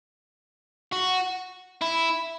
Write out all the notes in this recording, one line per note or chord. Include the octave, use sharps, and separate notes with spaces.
F#4
E4